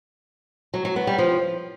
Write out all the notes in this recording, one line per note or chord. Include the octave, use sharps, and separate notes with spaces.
F#3
F#3
B3
G3
F3